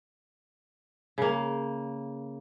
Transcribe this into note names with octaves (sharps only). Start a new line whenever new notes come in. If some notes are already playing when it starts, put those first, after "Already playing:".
C#3 A#3